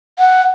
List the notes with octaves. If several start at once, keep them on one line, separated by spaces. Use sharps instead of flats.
F#5